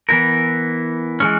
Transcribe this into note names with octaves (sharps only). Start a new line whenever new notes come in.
E3 B3 E4 A#4
E3 G#3 C#4